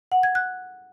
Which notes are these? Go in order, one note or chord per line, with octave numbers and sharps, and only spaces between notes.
F#5
G#6
F#6